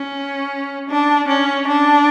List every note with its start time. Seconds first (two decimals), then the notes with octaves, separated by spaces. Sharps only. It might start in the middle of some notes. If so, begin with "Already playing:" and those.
Already playing: C#4
0.89 D4
1.28 C#4
1.67 D4